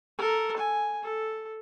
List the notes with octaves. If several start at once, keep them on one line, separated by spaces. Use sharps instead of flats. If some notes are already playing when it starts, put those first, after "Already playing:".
A4 A#4
G#5
A4